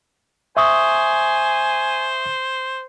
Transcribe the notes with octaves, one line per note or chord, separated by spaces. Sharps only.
C5 E5 G#5 C#6 D#6